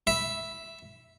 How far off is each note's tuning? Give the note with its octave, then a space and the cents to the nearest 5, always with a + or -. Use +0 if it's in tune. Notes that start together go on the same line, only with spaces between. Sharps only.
E5 +0 B5 -5